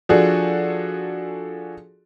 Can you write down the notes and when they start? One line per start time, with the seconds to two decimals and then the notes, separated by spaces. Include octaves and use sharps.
0.09 F3 D4 F#4 G#4 A4